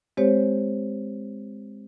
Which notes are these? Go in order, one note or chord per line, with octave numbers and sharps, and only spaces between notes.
G#3 C4 G4 C5 C#5